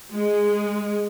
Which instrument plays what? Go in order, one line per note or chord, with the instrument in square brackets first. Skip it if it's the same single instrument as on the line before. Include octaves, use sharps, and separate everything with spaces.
[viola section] G#3